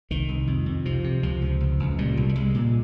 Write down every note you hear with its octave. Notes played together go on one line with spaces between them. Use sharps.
C2 D#3
C2
F2
F2
C3 F3
C3
C#2 F3
C#2
C#2
C#2
A#2 G3
C2
G3
C2 G#3
A#2